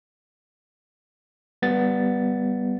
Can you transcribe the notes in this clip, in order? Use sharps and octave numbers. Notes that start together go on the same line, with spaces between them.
G3 B3 A6